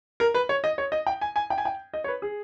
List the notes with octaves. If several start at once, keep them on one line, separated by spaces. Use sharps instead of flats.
A#4
B4
C#5
D#5
C#5
D#5
G5
G#5
G#5
G5
G#5
G5
D#5
C#5
B4
G#4